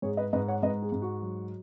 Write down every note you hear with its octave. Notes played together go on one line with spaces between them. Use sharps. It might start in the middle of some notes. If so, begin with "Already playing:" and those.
G#2 G#4 C#5
B4 D#5
G#2 B4 D#5
C#5 F#5
G#2 B4 D#5
G#4
G#2
F#4
F#3